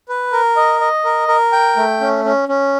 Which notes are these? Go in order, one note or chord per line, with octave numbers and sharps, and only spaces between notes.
B4
A#4
D#5
D#5
A#4
A#4
G5
A3
C#4
C#4
C#4